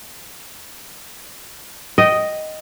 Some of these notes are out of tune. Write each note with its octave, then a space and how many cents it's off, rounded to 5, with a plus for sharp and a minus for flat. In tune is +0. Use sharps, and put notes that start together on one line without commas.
D#5 +0 G5 -25